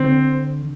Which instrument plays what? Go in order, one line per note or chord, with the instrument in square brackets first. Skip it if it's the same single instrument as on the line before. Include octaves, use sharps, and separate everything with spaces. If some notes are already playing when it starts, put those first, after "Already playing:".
Already playing: [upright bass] D3 [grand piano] C4